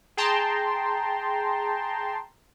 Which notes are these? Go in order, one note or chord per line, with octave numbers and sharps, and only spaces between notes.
G#4 G5 A5 A#5 C6